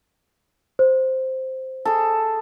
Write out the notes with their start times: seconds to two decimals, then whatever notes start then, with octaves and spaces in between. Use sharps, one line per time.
0.79 C5
1.85 G#4 A4